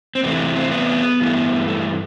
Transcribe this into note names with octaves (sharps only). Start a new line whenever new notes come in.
C4
E2 C3 E3 A3 B3
C4
B3
G2 E3 A3
A3